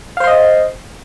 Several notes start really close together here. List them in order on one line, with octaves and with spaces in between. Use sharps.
F5 C5 C6 D#5